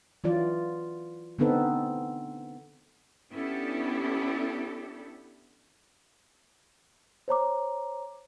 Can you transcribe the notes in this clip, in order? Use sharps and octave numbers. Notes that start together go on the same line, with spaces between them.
E3 F#3 F4 D5
D3 B3 C4 D#4 A4 B4
B3 C#4 D4 E4 G4 A4
C5 C#5 A#5 D6